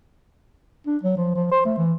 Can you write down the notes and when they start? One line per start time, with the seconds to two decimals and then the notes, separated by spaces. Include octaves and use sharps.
0.87 D4
1.03 F#3
1.17 F3
1.36 F3
1.51 C5
1.65 A3
1.78 E3